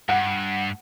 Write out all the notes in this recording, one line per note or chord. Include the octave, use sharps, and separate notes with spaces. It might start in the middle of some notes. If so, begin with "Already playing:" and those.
G2 F#5